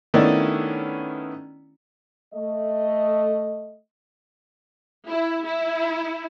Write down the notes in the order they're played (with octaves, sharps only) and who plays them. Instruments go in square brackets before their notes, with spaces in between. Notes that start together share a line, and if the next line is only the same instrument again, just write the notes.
[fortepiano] D#3 A3 B3 C#4 D4 E4
[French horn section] A3 D#5
[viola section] E4
E4